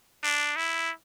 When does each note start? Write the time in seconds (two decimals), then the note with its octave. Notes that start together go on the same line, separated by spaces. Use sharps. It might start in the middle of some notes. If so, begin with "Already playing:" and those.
0.24 D4
0.56 E4